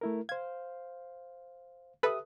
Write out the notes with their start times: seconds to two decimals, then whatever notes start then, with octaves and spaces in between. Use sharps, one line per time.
0.01 A3 E4 A#4
0.29 C5 F5 G#6
2.03 G4 A4 B4 E5 D#6